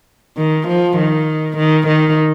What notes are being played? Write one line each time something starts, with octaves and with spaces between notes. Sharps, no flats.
D#3
F3
D#3
D#3
D#3